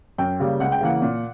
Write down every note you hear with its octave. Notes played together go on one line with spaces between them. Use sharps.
F#2 G5
C#3 G3 A#3
C#2 F#5
G5
C#3 E3 A#3 F#5
A#2